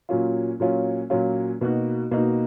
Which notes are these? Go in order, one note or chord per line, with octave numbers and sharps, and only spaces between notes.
A#2 F#3 C#4 F4
A#2 F#3 C#4 F4
A#2 F#3 C#4 F4
B2 A#3 D#4 F#4
B2 A#3 D#4 F#4